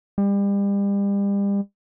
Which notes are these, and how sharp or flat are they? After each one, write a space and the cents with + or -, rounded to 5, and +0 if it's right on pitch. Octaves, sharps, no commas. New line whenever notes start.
G3 +35